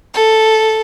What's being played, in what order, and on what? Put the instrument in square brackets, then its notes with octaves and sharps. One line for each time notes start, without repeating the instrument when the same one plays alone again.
[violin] A4